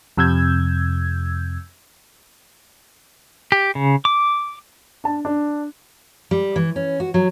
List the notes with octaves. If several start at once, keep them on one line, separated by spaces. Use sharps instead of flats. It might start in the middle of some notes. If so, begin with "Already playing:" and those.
F2 C3 E6 G6 G#6
G4
C#3
D6
D4 A5
D4
G3
E3
C#4
F#4
F#3